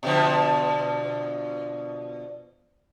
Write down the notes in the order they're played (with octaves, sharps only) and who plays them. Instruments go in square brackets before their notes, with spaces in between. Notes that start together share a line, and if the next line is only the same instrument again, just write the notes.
[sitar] B2 D3 F3